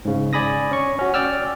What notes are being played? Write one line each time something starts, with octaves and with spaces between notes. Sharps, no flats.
G#2 C#3
D5 G#5 B5 D#6 A#6
C#4 C#6
C#4 F#4
D5 G5 E6 F6